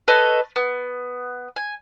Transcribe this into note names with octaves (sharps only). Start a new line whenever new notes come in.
A4 B4 C#5 D#5
B3
G#5